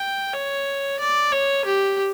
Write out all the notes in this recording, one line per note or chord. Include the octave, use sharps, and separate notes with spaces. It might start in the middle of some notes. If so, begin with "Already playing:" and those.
Already playing: G5
C#5
D5
C#5
G4